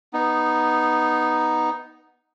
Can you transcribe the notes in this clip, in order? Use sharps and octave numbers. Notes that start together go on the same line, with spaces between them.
B3 D#4